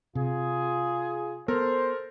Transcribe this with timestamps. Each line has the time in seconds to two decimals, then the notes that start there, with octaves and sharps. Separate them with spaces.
0.15 C3 F4 G#4
1.48 B3 A4 A#4 C5 F6